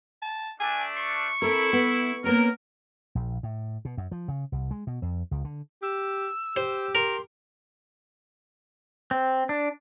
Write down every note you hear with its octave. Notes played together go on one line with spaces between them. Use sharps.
A5
A3 D4 G#5
C#6
C4 E4 A4 A#4
B3
A#3 B3 C#4 A#4
A#1
A2
B2
F#2
F3
C#3
C2
G#3
B2
F2
C#2
D3
G4 E6
G4 C5
A#4 C6
C4
D4